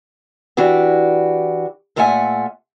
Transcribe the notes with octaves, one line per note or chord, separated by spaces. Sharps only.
E3 D4 F#4 G4
A#2 A3 F4 E5 F#5 G#5